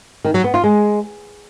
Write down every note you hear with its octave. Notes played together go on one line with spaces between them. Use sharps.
D#3
F#3
B3
F4
G#3